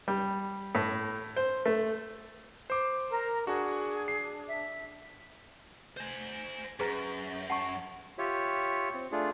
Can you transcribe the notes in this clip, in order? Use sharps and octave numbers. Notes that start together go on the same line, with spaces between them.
G3
A2
C5
A3
C5 D6
A#4 A#5
D4 F#4 G#4 F#5
C7
E5
C5 G#5
F#2 G#4 B4 A#5
F#5 A5 C#6
F4 G4 C#5 E5
C4
A3 D4 F4 G#4